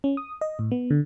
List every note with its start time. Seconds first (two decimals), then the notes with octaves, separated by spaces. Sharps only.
0.04 C#4
0.17 D#6
0.41 D#5
0.59 A2
0.71 B3
0.91 D3